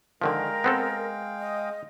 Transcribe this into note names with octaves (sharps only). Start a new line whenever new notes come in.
D3 D#3 F3 G#3 A#4 F5 G5
B3 C4 A4
D#5